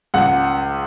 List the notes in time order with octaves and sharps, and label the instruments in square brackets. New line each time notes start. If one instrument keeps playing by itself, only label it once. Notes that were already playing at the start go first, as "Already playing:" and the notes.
[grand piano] C#2 F#5